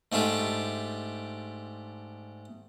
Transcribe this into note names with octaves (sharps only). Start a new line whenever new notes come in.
G#2 A3 D4 F4 G4